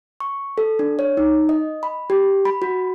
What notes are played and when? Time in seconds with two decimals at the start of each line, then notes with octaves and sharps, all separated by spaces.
0.20 C#6
0.58 A4
0.79 D4
0.99 C#5
1.17 D#4
1.49 D#5
1.83 B5
2.10 G4
2.45 B5
2.62 F#4